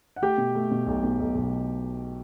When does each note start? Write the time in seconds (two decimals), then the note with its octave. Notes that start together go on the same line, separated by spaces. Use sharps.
0.16 F#5
0.22 A3 G4 G5
0.38 B2
0.55 A3
0.71 B2
0.87 B1
1.04 B2
1.20 B1
1.35 B1